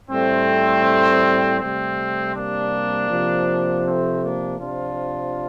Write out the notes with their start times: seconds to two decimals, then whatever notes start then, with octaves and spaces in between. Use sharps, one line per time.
0.10 A2 G3 A3 C4
1.60 C3 G3 A3 C4
2.35 A#3 D4
3.10 C3 F3
3.85 A3 C4
4.22 A#3 D4
4.60 C3 F3 D4 F4